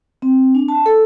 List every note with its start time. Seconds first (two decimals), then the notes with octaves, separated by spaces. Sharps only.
0.22 C4
0.55 D4
0.68 A5
0.86 A4